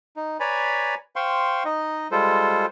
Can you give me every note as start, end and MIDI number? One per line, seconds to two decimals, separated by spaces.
0.17 0.37 63
0.40 0.95 71
0.40 0.95 73
0.40 0.95 74
0.40 0.95 80
0.40 0.95 82
0.40 0.95 83
1.16 1.63 72
1.16 1.63 77
1.16 1.63 79
1.16 1.63 84
1.16 1.63 85
1.65 2.08 63
1.65 2.08 75
2.11 2.66 55
2.11 2.66 56
2.11 2.66 65
2.11 2.66 69
2.11 2.66 72